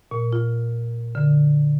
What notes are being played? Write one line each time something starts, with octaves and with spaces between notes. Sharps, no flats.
A#2
F4
D3